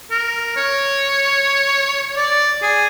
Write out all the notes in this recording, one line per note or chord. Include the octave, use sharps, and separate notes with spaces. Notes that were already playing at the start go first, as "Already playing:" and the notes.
A#4
C#5
D5
G#4